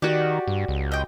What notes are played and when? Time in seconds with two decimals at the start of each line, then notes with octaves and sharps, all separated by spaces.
0.02 D#3 F#4 G4 D5
0.48 G2
0.68 C#2
0.92 D#5 G5